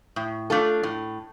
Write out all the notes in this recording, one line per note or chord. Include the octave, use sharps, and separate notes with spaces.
A2
A3 D4 F4 A4
A2